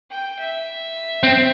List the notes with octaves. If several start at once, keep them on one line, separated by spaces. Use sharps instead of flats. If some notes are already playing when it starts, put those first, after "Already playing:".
G5
E5
C4